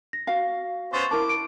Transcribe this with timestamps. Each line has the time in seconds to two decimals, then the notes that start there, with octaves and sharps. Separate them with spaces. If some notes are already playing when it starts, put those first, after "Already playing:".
0.13 A#6
0.27 F#4 F5
0.93 B3 C#4 C5 C#6 A6
1.11 E4 A#4 A5 D6
1.29 D7